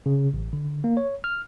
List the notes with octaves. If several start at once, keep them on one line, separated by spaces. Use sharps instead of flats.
C#3
A1
D3
A#3
C#5
F6